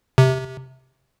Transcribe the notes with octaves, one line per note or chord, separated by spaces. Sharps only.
C3